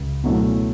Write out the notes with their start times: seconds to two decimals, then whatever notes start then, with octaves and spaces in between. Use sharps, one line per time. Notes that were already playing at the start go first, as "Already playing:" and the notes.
Already playing: C#2
0.24 B2 F#3 A3 C#4 E4